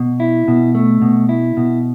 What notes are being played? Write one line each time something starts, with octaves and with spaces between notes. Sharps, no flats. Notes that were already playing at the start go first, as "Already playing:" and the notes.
Already playing: B2
E4
B2
A3
B2
E4
B2